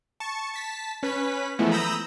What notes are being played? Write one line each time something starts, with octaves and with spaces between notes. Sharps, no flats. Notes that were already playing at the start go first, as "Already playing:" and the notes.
A5 C#6
A5 B6
C#4 B4 B6
E3 F3 G#3 A3 B3 E4
A#5 B5 D#6 E6 G6 A#6